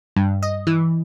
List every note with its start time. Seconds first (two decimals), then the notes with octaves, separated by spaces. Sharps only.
0.16 G2
0.43 D#5
0.67 E3